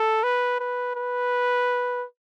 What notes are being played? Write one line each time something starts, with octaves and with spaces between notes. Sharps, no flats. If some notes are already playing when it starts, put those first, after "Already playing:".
Already playing: A4
B4
B4
B4